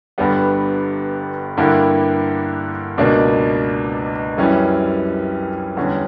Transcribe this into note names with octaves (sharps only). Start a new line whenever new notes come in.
G1 G2 D3 G3 B3
G2 D3 A#3 E4 G4
C#2 B2 A#3 D4
F#2 E3 G3 C#4
E2 D3 G3 C#4